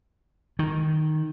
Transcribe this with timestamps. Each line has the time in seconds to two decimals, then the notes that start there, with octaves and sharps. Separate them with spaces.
0.59 D#3